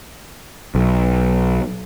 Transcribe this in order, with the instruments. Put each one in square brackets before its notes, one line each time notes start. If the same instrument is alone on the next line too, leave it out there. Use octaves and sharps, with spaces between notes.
[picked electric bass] B1